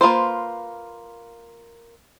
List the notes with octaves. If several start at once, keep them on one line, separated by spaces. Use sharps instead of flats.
A#3 F4 B4 C5